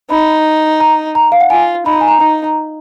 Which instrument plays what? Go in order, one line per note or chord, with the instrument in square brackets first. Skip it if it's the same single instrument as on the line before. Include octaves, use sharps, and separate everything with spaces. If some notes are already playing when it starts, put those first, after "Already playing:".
[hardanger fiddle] D#4 [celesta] B5
[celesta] A#5
A#5
F5
F#5
[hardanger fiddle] F4 [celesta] G#5
[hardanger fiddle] D#4 [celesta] B5
[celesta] A#5
G#5
A#5
[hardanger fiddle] D#4 [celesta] A#5
[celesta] A#5